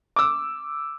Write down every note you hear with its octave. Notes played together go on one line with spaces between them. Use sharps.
D6 E6